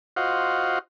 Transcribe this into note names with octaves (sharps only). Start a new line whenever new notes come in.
F4 F#4 C5 D#5 F5 F#5